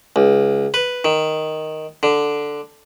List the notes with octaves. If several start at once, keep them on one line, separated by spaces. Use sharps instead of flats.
C#2
B4
D#3
D3